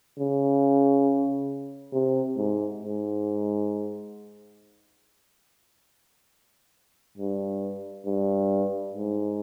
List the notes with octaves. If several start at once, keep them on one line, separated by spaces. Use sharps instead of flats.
C#3
C3
G#2
G#2
G2
G2
G#2